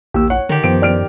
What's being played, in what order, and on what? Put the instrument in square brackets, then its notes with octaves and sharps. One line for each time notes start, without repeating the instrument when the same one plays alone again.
[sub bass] A#1 [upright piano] D#2 [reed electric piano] G4 E6
[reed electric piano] C#5 [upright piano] F#5
[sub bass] D3 [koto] D#3 G4
[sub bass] F#2 [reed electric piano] F3 B3 C5 [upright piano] D7
[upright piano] D5 F6 D7